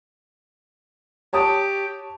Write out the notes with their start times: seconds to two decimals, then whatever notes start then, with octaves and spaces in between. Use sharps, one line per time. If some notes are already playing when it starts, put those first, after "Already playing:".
1.33 G4 C#5 A5 D#6